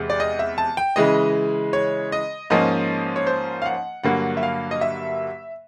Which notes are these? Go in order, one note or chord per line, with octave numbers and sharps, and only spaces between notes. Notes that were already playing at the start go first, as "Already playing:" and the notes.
Already playing: E2 C3 G#3
D5
D#5
E5
A5
G5
C#3 E3 G#3 D#5
C#5
D#5
G#2 F3 A#3 C#4 D#5
C#5
C5
F5
F#5
G2 D3 F#3 A#3 F#5
E5
F5
D#5
E5